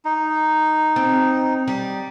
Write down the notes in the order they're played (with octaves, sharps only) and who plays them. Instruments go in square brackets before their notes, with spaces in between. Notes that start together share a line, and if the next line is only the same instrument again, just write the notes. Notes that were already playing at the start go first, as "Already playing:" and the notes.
[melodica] D#4
[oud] C4
G3